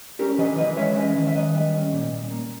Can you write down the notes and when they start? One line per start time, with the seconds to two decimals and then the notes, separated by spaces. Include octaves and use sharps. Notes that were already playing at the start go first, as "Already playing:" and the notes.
0.19 C#4 G4 A#4
0.38 E3 B4 D#5
0.58 E3 B4 D#5
0.77 G#3 C#5 E5
0.96 C#4 B4 D#5
1.15 D#3
1.27 E5
1.34 D#3 B4 D#5
1.54 G3
1.74 C#4
1.93 A#2
2.12 A#2
2.30 A#3